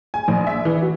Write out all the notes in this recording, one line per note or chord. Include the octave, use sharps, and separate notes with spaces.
G#5
A#1
E5
E3
F#4